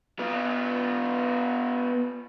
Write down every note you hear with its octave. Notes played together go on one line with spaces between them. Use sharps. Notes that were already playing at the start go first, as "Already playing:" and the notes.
B3 F4